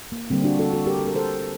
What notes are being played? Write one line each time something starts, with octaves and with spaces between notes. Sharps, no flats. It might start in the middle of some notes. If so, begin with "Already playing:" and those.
A#3
D3 G3 A#3 C4
D4 F#4
F#4 A4
F#4 A4
G4 A#4
A4
A#4
A4 C5